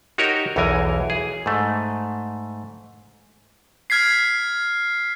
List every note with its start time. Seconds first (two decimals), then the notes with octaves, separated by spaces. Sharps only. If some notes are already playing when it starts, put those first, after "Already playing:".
0.18 D#4 F#4 G4 A#4 C#5 D#5
0.56 B1 E2 E3 A#4 G#5
1.10 G#4
1.46 G#2 A3
3.90 F6 G#6 B6 C7